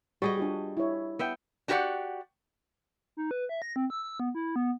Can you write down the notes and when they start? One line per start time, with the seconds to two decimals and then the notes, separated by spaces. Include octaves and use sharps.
0.22 G3 F#4 G#4 C5 D#5 C#6
0.37 D4 F4 G4
0.77 E4 C#5
1.19 B3 E5 G5
1.68 D4 F#4 G4 A#4 D5 F#5
3.17 D#4
3.31 B4
3.49 E5
3.62 A#6
3.76 C4
3.90 E6
4.03 E6
4.20 B3
4.35 E4
4.56 B3